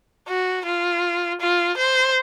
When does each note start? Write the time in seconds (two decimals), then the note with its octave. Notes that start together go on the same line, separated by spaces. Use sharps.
0.28 F#4
0.65 F4
1.41 F4
1.78 C5